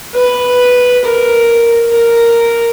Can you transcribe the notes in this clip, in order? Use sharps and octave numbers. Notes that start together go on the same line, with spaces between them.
B4
A#4
A#4